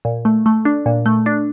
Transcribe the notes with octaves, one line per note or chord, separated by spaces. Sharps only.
A#2
A3
A3
D4
A#2
A3
D4